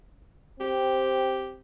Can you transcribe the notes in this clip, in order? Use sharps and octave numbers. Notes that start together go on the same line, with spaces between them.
C4 G4